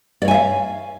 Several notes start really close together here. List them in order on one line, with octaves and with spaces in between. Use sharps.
D5 C#5 G#5 E5 F5